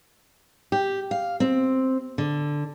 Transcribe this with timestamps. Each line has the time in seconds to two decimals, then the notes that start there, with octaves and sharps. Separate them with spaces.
0.72 G4
1.11 F5
1.40 C4
2.18 D3